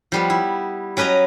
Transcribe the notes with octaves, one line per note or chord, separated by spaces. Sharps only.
F3 G3 B3
E4
F#3 C#4 B4 D#5 A#5